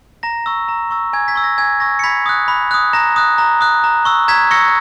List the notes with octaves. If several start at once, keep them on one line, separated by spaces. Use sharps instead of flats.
A#5 A#6
C#6 E6
A#5
C#6 E6
G#5 G#6
G#6 B6
C#6 E6
A#6
G#5 G#6
C#6 E6 A#6
C#7
B5 G#6 B6
D#6 F#6
B5
D#6 F#6
A#5 A#6
D#6 F#6
A#5
D#6 F#6
A#5
C#6 E6
A#5 G#6 B6
C#6 E6 A#6 C#7